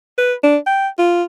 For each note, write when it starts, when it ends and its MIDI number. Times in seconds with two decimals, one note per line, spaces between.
0.18 0.34 71
0.43 0.57 62
0.67 0.88 79
0.99 1.23 65